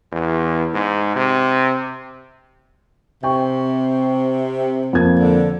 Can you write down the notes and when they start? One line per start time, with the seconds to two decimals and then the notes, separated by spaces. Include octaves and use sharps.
0.12 E2
0.74 G#2
1.16 C3
3.23 C3 G5 C#6
4.93 F2 A#3 G#6
5.19 D3